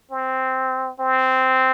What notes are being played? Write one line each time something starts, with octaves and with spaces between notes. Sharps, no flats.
C4
C4